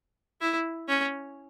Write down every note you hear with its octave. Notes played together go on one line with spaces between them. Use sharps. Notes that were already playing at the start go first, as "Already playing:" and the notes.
E4
C#4